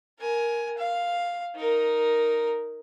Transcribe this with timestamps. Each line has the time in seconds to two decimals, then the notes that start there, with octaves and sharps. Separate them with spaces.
0.19 A#4 G#5
0.78 F5
1.56 D#4 A#4